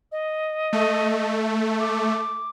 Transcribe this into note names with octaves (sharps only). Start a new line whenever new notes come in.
D#5
A3
D6